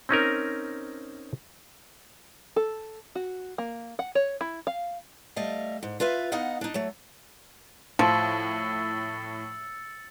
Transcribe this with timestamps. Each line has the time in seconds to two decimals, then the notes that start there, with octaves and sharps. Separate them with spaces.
0.09 C4 C#4 D#4 A#4
2.56 A4
3.15 F#4
3.58 A#3
3.99 F#5
4.15 C#5
4.41 E4
4.67 F5
5.36 G3 A3 D#5 F5
5.83 G#2
6.00 F4 B4 E5 F5
6.32 B3 D#4 D#5 F5 F#5
6.61 D4 D#4
6.74 F#3 A3
7.99 A2 F3 E6 A6 C#7